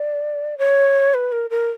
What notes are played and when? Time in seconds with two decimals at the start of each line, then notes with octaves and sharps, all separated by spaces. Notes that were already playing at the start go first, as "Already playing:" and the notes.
Already playing: D5
0.58 C#5
1.14 B4
1.32 A#4
1.50 A#4